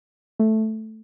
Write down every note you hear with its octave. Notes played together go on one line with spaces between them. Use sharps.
A3